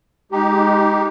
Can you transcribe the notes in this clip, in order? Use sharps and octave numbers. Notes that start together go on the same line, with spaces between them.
G#3 D#4 G4